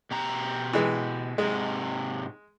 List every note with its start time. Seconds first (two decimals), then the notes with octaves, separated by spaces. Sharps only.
0.11 B2 G4 A#5
0.73 E3 G#3
1.38 G#2 C3 G#3